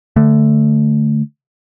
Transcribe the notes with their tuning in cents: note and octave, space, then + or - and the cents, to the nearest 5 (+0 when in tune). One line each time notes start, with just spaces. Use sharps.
D3 +0 A3 +0